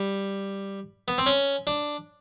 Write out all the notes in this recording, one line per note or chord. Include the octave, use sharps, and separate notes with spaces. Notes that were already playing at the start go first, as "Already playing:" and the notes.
Already playing: G3
B3
C4
C#4
D4